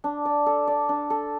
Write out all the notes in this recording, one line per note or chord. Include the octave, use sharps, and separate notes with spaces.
D4
D5
A4
D5
D4
A4